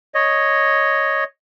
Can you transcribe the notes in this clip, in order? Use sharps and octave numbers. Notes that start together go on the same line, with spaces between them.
C#5 D#5